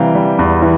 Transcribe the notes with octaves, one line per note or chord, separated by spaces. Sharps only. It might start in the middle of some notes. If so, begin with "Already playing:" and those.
Already playing: C3 E3 G3 F5 G5 A#5
G3
E2
E3